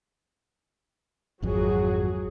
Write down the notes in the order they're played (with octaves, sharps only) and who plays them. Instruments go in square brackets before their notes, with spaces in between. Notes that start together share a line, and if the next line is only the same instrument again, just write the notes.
[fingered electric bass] G#1 F2 [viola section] F#3 F#4 G#4